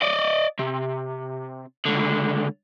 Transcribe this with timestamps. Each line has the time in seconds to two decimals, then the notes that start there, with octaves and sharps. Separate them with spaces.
0.02 D5 D#5
0.59 C3
1.85 C#2 D3